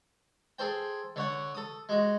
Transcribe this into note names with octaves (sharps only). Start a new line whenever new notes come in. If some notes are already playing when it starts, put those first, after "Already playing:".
G#4 A4 C5 G5
D3 C#5 F#5 C#6
A4 D#6
G#3 F#4